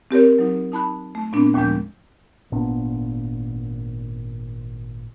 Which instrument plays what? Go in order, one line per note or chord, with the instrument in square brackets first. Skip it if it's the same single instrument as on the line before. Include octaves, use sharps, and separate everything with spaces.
[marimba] C4 G4 A#4 C#5
F#3 D#4
D#4 A5 B5 F#6
A3
A#2 B3 C4 D4
D#2 A#2 F3 G#3 D4 G6
[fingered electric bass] G#1 A#2 B3 D4